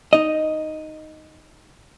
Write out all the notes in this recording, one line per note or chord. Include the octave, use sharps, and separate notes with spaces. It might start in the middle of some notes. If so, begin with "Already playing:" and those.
D#4 D#5